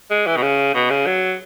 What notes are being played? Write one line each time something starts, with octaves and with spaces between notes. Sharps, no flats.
G#3
E3
B2
C#3
B2
C#3
F#3